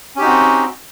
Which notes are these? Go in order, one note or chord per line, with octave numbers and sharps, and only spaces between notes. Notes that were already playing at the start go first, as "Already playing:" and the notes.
C4 C#4 D#4 F#4 G4